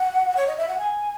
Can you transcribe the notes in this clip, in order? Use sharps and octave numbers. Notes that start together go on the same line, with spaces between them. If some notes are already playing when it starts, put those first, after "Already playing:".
Already playing: F#5
C#5
D#5
E5
F#5
G#5